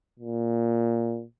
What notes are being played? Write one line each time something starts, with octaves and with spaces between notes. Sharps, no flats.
A#2